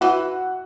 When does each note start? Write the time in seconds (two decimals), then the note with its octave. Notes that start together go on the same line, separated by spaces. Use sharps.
0.01 E3 F#4 F#5